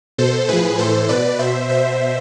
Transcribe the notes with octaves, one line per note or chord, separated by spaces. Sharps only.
B2 A4 C5
A2 F3 G#4 B4
A2 E3 A4 C5
B2 B4 D5
B2 C5 E5
B2 C5 E5